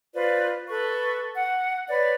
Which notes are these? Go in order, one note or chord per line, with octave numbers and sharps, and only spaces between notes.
F4 B4 C5 D5
A4 B4 C#6
F#5
B4 C#5 D5